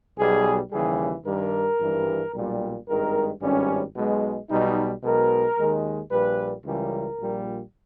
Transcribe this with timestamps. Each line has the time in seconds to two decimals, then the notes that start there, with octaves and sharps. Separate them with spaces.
0.17 B1 B2 G3 G#4
0.71 D#2 C#3 E3 G3 G#4
1.26 G2 D#3 G3 A#4
1.80 G#1 G2 E3 G3
2.34 B1 A#2 G3
2.88 G#1 G2 D#3 G#3 A#4
3.41 G#1 G2 G3 C#4
3.96 B1 B2 G#3
4.49 B1 B2 G3 D#4
5.03 B1 B2 G#3 A#4
5.58 D#2 D#3 G#3
6.11 A#1 A#2 G3 B4
6.65 C#2 C#3 E3 G3 A#4
7.19 A#1 A#2 G3